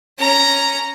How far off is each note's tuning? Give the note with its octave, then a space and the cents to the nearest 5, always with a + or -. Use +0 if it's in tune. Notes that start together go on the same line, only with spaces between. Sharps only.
C#4 +0 A#5 +0